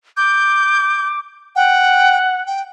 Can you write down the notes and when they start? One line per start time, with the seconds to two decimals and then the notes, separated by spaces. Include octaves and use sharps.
0.17 D6 G6
1.56 F#5 G5
2.47 G5